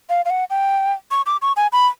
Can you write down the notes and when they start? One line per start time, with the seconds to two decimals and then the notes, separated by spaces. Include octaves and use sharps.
0.09 F5
0.25 F5
0.30 F#5
0.50 G5
1.11 C#6
1.26 D6
1.42 C#6
1.57 G#5
1.72 B5